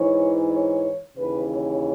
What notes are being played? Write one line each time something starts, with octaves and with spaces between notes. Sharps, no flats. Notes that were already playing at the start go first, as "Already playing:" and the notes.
Already playing: G#2 E3 C#5
C#5
D#2 C#3 E3 B4
C#5